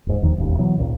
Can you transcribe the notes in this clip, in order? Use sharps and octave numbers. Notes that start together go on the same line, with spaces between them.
D#1 G#2
E1 D#2 D#3 F3
E1 A1 D#2
B2 E3 F#3
G#1 C#2 A#2